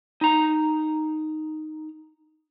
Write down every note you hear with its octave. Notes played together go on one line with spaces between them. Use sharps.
D#4 A#5